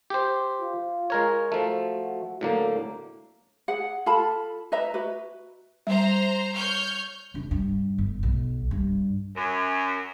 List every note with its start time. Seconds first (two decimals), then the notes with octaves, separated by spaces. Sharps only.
0.10 G4 C5
0.61 F4
1.10 G#3 A#4 C#5
1.52 F3 A3 F#4
2.41 A2 D3 F#3 A#3
3.68 G#4 F#5
4.06 F4 A4 A5 B5
4.72 B4 D#5 E5 A#5
4.94 F#4 B4
5.87 G3 C5 E5 A#5
6.54 C#5 F6 G6
7.34 F1 D4
7.51 G2
7.98 G1
8.23 B1
8.71 G2
9.35 F#2